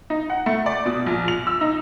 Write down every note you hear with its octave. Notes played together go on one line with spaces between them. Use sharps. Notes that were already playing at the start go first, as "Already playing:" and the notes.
D#4
F#5
A3
D5
B2
A#1
F7
E6
D#4